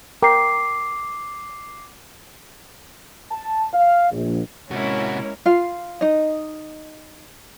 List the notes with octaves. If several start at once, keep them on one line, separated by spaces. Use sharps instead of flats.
A#4 G5 A#5 D6 C7
A5
F5
A#1
C3 G#3 A#3 C#4 E4 F#4 C#5
F4 F5
D#4 D#5